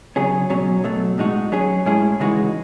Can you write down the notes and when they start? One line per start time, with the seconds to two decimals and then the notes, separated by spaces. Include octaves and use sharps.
0.16 C#3 F#3 C#4 G#4
0.50 B2 F#3 C#4
0.84 B2 F#3 A3
1.18 A2 G#3 D#4 F#4
1.52 F#3 C#4 G#4
1.86 A2 G#3 C#4 E4 G#4
2.20 C#3 E3 G#3 D#4 F#4